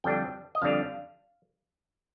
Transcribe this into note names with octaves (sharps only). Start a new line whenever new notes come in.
F2 D3 G3 D4 G5
D#5
F2 D3 G3 D4 F5